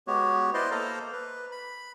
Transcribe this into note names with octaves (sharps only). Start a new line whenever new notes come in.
G#3 B3 F#4 G4 C#5
E4 B4 C5 D5 D#5 C6
A#3 A4 C5 D#5 F5 A#5
B4
B5